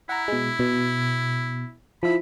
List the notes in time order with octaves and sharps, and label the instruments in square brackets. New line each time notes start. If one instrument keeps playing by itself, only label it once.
[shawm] E4 [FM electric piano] F#5 A#5
[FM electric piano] B2 G#3
B2
[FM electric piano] F3 E4 [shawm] B5